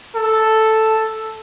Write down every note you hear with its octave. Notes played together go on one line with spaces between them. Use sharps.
A4